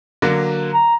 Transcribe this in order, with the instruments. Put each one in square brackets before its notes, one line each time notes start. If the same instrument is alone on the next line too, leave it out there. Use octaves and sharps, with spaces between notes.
[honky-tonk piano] D3 F#3 A#3
[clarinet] A#5